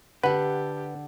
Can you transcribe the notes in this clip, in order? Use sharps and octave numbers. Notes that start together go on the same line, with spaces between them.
D3 G4 A4 B4 F#5